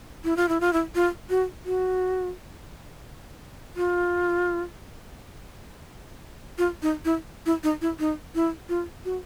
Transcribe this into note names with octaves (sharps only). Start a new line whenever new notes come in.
E4
F4
E4
F4
E4
F4
F#4
F#4
F4
F4
D#4
E4
E4
D#4
E4
D#4
E4
F4
F#4